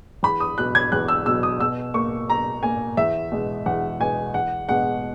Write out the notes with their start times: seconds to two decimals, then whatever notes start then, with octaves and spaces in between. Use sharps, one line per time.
0.23 E2 B5
0.40 D#6
0.58 B2 F#3 F#6
0.75 G#6
0.92 E2 F#6
1.08 E6
1.26 B2 F#3 E6
1.43 D#6
1.60 B2 E6
1.94 A#3 C#6
2.29 B2 A#5
2.63 A#3 G#5
2.97 E2 E5
3.32 B2 G#3 B3
3.66 E2 F#5
4.00 B2 G#3 B3 G#5
4.34 E2 F#5
4.68 B2 G#3 F#5